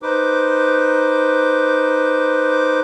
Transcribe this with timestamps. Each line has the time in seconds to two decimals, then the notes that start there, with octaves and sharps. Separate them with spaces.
0.02 D#4 B4 C5 D6